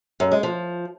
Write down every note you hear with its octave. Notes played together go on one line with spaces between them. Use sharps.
F#2
G#3
F3